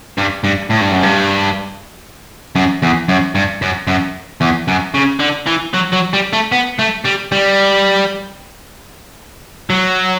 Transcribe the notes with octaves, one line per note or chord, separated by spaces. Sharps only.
G2
G2
A2
G2
F#2
G2
F#2
E2
F#2
G2
F#2
F#2
E2
F#2
C#3
D3
E3
F#3
F#3
G3
A3
B3
A3
G3
G3
F#3